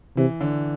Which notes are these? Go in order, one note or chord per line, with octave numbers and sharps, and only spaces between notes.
C3 E3
D3